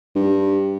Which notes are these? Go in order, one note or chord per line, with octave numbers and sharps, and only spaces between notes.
G2